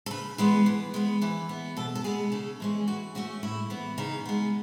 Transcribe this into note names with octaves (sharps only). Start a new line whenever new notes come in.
A4
C#3 B4
E3 G#3 B3 B4
E3
G#3 B3
E3 B4
B3
B2 A4
A4
G#3 B3 G#4
C#3 A4
E3 G#3 C#4
E3 F#4
A3 C#4 F#4
A2 E4
E3 B3
C#3 D#4
G#3 B3